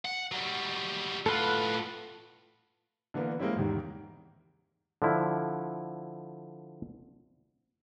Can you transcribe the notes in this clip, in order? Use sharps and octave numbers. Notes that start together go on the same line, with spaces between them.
F#5
F#3 G3
A2 F4 A4 B4 F#5
D3 E3 A#3 B3
G#3 A#3 C4 C#4 E4
E2 G#2 C3 D#3
D3 F3 E4